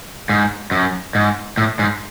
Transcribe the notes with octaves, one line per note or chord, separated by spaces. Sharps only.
G#2
F#2
G#2
A2
G#2